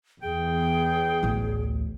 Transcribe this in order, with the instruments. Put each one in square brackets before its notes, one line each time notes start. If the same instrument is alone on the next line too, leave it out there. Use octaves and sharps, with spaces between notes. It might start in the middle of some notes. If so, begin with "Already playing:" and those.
[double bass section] E2 [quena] G#4 [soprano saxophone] G5
[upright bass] A1 D2